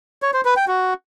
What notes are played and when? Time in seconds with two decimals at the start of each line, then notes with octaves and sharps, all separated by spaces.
0.22 C#5
0.34 C5
0.45 B4
0.56 G5
0.68 F#4